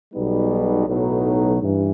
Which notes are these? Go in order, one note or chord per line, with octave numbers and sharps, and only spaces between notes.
B1 B2 G3 B3 D#4
B1 A2 F#3 B3 D#4
G2 E3